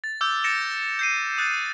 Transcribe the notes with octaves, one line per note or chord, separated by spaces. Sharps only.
A6
D6 E6 F6 G6
E6 A6 A#6 C#7 D7 E7
G6 C7 D#7
D#6 F#6 A6